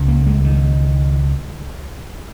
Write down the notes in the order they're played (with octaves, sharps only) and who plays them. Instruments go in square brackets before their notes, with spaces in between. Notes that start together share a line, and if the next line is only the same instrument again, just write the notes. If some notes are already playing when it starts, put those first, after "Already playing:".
Already playing: [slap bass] C#2 C#3
A#3
G#3
D#3